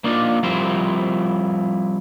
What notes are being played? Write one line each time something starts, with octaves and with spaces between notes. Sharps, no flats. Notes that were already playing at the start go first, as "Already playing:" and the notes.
A#3 D4 D#4 F4
F3 G3 C4 E4 A#4 C5